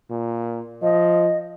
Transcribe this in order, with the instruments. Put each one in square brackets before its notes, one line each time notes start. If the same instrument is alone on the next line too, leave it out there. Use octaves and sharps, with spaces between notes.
[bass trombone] A#2
[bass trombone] F3 [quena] D#5